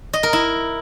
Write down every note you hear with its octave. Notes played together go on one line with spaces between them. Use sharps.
D#5
A#4
E4